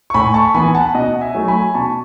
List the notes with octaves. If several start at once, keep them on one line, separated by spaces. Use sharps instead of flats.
C#6
A2 G#5 B5
A5 C#6
E3 B3 G#5 B5
F#5 A5
B2 D#5 F#5
E5 G#5
F#3 A3
G#5 B5
B2 A5 C#6